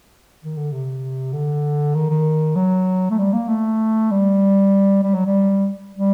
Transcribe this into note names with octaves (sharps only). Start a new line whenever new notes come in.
D#3
D3
C3
D3
D#3
D#3
F#3
A3
G3
A#3
A3
G3
G3
F#3
G3
G3